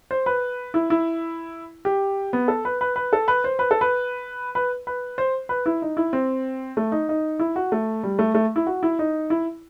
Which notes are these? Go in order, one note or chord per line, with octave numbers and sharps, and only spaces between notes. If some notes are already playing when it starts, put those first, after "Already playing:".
C5
B4
E4
E4
G4
B3
A4
B4
B4
B4
A4
B4
C5
B4
A4
B4
B4
B4
C5
B4
E4
D#4
E4
C4
A3
D#4
D#4
E4
F#4
A3
G3
A3
A3
E4
F#4
E4
D#4
E4